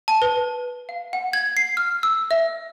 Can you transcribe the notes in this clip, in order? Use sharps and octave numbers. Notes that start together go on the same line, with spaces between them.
A5
B4
F5
F#5
G#6
C7
F6
E6
E5